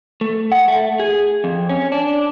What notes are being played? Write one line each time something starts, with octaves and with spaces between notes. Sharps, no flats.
A3
F#5
A3
G#4
F2
C#4
D4